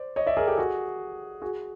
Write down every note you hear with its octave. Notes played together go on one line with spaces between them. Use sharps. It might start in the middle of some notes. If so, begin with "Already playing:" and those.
Already playing: C5 D5
C#5 D#5
D5 E5
G#4 A#4
G4 A4
F#4 G#4
F#4 G#4